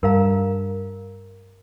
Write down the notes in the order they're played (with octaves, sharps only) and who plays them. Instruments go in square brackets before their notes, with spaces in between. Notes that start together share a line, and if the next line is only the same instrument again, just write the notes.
[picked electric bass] G2 [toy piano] A#4 F5 A#5